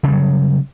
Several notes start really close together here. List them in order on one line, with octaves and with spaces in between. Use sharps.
C#3 G3 F#3